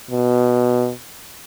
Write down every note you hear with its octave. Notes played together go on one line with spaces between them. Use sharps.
B2